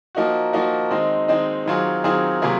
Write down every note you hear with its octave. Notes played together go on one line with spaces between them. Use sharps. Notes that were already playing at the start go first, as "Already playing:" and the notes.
F3 A#3 D#4 F#4
F3 A#3 D#4 F#4
D#3 G#3 C4 D#4
D#3 G#3 C4 D#4
D#3 F#3 C4 F4 G#4
D#3 F#3 C4 F4 G#4
C3 F#3 A#3 F4 G#4